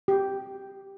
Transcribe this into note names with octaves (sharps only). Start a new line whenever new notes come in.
G4